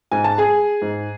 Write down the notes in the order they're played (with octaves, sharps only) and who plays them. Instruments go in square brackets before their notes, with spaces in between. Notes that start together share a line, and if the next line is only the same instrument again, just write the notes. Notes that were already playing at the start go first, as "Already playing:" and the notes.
[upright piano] G#2 G#5
A5
G#4 G#5
G#2